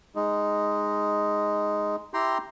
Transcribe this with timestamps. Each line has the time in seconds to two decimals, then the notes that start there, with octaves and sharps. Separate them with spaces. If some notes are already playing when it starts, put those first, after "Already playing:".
0.15 G#3 D#4
2.14 E4 G4 G5 A#5 C6